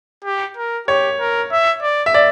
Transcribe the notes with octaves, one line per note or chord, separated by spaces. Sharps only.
G4
A#4
G4 C#5
A#4
E5
D5
E5
D5